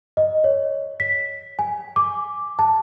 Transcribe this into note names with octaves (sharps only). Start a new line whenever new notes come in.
D#5
C#5
B6
G#5
D6
A5